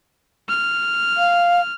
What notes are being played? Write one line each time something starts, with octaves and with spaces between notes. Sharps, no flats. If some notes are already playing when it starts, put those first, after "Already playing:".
F6
F5